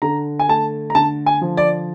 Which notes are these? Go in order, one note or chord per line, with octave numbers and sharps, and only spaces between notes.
D3 A#5
G#5
A3 A5
A#5
D3 A5
G#5
F3
D5